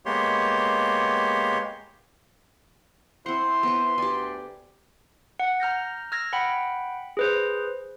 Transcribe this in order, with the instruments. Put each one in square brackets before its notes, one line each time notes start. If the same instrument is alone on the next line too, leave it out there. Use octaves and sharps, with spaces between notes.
[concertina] G#3 A#3 B3 G4 C#5 C6
[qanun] C4 F#5 [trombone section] E4 [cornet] C5 [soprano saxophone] C6
[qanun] B3 B4
[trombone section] D2 [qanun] G4 G#5 [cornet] D5
[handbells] F#5
A#5 F6 G6 A#6
E6 F6 G#6 A#6
F#5 G5 B5
G#4 B4 C5